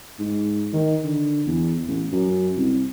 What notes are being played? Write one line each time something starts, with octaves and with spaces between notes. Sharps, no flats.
G#2
D#3
D3
E2
A1
F#2
C2